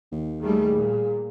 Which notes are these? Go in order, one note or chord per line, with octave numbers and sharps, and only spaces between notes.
D#2
D#3 G3 A3 G#4
A#2